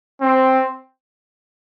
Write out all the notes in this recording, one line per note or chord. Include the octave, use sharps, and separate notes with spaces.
C4